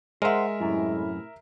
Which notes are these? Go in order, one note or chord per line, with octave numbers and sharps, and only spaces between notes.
G#3 A#4 C5 E5 F#5
F#2 A2 C3 E4